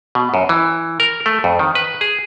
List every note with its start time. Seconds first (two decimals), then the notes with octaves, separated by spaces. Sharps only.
0.15 B2
0.34 F#2
0.49 E3
1.00 A#4
1.26 A3
1.44 F2
1.59 D#3
1.75 B4
2.01 G#4